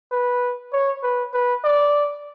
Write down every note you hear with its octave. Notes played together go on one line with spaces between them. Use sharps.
B4
C#5
B4
B4
D5